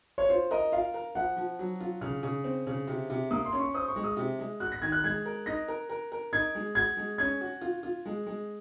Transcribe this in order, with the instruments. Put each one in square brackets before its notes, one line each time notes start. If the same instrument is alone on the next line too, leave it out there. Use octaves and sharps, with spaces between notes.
[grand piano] C#5
[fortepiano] F4 [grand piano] C5
[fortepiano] A#4 [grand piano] D#5
[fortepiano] F4 [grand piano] F5
[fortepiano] A#4
[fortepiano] F3 [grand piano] F#5
[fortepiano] F3
F#3
F4
[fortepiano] C#3 [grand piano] F6
[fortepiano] C#3
C4
C#3
C3
C3
[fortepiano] A#3 [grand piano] D#6
[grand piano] C6
[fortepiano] C#4
[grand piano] C#6
[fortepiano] C5 [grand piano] D#6
[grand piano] C#6
[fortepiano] G#3
[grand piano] D#6
[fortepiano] C3
G#3
[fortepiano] F#4 [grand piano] F#6
[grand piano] A#6
[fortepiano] D#3 [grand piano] G#6
[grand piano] F#6
[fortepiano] G#3 [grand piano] G#6
[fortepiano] A#4
[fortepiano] D#4 [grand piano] A#6
[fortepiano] A#4
A#4
A#4
[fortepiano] D#4 [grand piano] G#6
[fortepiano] G#3
[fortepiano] F#4 [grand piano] G#6
[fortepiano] G#3
[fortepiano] C#4 [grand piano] G#6
[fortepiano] F#4
F4
F4
G#3
G#3